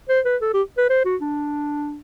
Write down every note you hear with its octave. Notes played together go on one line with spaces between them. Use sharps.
C5
B4
A4
G4
B4
C5
F#4
D4